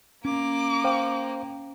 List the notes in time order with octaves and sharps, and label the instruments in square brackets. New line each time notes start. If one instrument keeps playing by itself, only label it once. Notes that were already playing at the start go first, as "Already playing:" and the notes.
[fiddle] A#3 [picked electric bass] C#4 [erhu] D6
[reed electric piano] C5 F5 G5